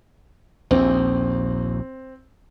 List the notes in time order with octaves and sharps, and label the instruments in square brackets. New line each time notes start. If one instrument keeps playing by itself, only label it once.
[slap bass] A#1 D#2 [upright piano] C4